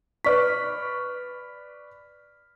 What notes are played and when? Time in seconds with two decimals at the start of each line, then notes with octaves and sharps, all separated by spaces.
0.25 B4 D5 C#6 F6 B6